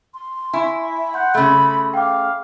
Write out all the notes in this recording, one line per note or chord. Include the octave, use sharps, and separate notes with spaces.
C6
E4 G#5 C#6
F#5 C6 G6
C#3 A3 B5 C6
F5 G5 D6